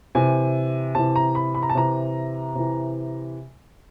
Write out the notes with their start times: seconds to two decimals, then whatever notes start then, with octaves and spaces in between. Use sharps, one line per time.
0.15 C3 E3 G#5
0.95 C3 E3 A5
1.16 A#5
1.35 B5
1.55 B5
1.63 A#5
1.70 A5
1.75 C3 E3 A#5
2.55 C3 E3